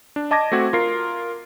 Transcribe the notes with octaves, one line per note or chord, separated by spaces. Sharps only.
D4
D#5 A5 D6 G#6 A#6
A3 C4 F#4 G#6
F4 A#4 C7